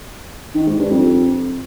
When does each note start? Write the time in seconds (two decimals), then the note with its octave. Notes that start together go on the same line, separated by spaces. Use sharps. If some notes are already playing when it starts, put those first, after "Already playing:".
0.55 D#3
0.67 G#2
0.78 G2
0.90 F2